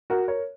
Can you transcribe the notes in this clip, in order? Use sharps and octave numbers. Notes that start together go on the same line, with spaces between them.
F#4 A#4
A#4 C#5